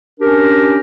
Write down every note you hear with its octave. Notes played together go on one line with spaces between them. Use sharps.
C#4 D4 G4 A#4